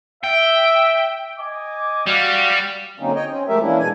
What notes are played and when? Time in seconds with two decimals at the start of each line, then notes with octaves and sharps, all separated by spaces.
0.24 E5 G5
1.38 D#5 G#5 D6
2.06 G3 F#4 F5
3.00 D3 F#3 A#3 C4 C#4 D#4
3.15 C#5 D#5 G5
3.28 C4 C#4
3.48 F3 G#3 A3 G4 A#4 E5
3.62 E3 A#3 C#4 D4 E4
3.79 B2 G#3 G#5